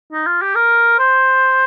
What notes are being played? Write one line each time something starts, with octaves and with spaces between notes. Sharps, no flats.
D#4
F4
G4
A#4
C5